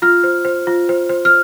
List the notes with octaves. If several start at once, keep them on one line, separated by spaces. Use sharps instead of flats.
F4 F6
C5
C5
F4
C5
C5
F6